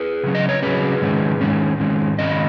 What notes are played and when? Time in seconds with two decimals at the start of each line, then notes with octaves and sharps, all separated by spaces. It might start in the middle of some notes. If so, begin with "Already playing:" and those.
Already playing: G#4 B4
0.23 C#3 F#3 C#4
0.35 D#5
0.49 C#5
0.62 C#3 F#3 C#4 G#4 B4
1.02 G#2 D#3 G#3 C#4
1.41 G#2 D#3 G#3 C#4
1.80 G#2 D#3 G#3 C#4
2.19 G#2 D#3 G#3 C#4 D#5